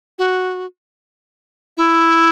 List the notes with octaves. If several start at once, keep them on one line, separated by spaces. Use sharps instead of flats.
F#4
E4